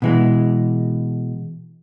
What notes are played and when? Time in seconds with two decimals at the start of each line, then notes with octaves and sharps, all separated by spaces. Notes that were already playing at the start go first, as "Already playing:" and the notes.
0.02 B2 E3 G#3